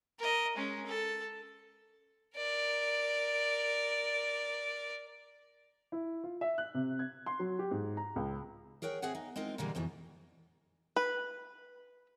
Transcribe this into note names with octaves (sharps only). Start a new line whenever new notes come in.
A#4 D#5
G#3 C#4
A4
A#4 D5
E4
F4
E5
F#6
C3
G#6
C6
F#3
G4
G#2
A#5
C#2
G#4 A#4 C#5 F#5 G5
A2 C4 G#4 E5 F#5 G#5
D#4
G#3 C4 D#4 F4 A#4
A#2 D3 E3 G3 G#3 A#3
F2 G#2 B2 E3
B4